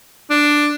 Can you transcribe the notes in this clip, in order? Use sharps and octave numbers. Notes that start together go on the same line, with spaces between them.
D4